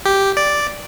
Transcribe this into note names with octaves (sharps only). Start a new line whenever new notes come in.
G4
D5